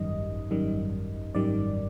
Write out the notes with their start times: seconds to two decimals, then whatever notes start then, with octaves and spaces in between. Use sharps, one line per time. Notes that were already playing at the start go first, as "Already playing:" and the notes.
Already playing: G#1 F#2 D#3 G3 D#5
0.50 G#1 F#2 D#3 G3
1.35 G#1 F#2 D#3 G3 D5